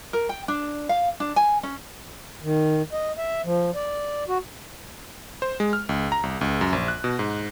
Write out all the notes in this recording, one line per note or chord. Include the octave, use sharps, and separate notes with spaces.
A#4
G5
D4
F5
D4
G#5
C#4
D#3
D#5
E5
F3
D5
F#4
C5
G#3
F6
C#2
A#5
C2
C#2
F#2
A#1
F#6
B2
G#2